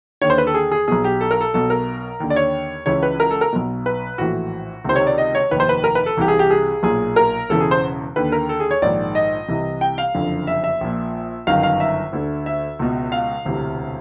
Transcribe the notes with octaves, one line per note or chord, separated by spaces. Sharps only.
D#2 D3 C#5
C5
B4
A4
G#4
G#4
B1 B2 G#4
G4
A4
A#4
A4
B1 B2 A4
A#4
D#2 D3
D5
C#5
C#2 C#3 E3 C#5
B4
A#4
A4
A#4
B1 B2
B4
A#1 A2 E3 F#4
C#2 C3 D#3 C5
C#5
D5
D#5
C#5
F1 D#2 D#3 B4
C5
B4
A#4
B4
A4
C2 C3 E3 G4
G#4
G4
G#4
B1 A#2 G#4
A#4
E1 E2 C#3 E3 A4
G#4
C5
D#2 D3 B4
A#4
A4
G#4
C#5
A#1 G#2 D#3 D5
D#5
C2 C3 E3
G5
F5
F#1 F2 D3
E5
E5
A#1 A#2
G1 F#2 D#3 F5
F5
E5
D2 D3
E5
C#2 B2
F5
E1 D2 C3 E3